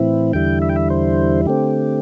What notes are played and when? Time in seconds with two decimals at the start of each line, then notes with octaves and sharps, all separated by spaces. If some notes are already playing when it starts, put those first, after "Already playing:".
Already playing: A2 E3 C4 E4
0.33 E2 D3 G3 E4 G5
0.62 E5
0.69 G5
0.76 E5
0.90 C5
1.46 D3 A3 C4 G4